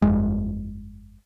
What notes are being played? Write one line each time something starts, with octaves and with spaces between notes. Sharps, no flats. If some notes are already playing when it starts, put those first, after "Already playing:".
G1 F2 G#3